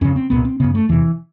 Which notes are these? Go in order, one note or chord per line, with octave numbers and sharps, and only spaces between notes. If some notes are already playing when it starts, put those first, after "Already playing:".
F2 C#3 C#4
C4
C2 A#2 B3
C4
F#2 C#3 B3
A3
E2 C3 E3